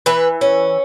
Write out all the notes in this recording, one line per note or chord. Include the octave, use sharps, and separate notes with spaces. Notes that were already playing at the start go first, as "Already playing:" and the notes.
E3 B4
C#4